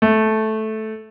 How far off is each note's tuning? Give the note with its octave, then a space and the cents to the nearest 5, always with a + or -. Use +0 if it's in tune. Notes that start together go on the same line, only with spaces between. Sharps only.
A3 -10